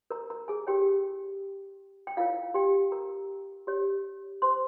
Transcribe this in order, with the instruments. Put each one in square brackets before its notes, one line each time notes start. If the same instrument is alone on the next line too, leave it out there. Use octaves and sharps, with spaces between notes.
[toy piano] A#4 A#5
A#4 A#5
G#4 G#5
E4 G4 A#4 C#5 G5
G5
E4 F4 A#4 C#5 F5
G4 G5
A#4 A#5
G4 C#5
C5 C6